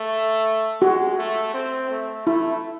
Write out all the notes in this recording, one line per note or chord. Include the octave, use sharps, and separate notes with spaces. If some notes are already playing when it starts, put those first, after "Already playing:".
Already playing: A3
G#3 F#4
A3
C4
A3
A3 E4